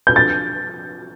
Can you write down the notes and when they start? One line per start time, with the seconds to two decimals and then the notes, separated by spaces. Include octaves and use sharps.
0.07 G6
0.16 A6